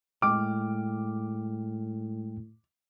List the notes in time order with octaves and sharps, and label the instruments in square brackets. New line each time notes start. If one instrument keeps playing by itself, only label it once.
[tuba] A2 [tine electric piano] G#3 G5 F6 [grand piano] D6